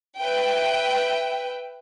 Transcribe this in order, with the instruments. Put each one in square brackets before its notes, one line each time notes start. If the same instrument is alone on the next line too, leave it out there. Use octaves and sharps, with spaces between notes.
[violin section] B4 E5 G5